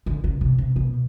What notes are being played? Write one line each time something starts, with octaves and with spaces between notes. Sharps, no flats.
D3
C#3
C3
C3
B2